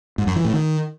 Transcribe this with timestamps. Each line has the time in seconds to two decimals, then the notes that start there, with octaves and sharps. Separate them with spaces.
0.18 G#2
0.27 F#2
0.36 E3
0.45 A2
0.53 D#3